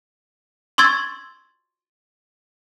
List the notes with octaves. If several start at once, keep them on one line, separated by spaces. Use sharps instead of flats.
C6 C#6 E6 G#6 A6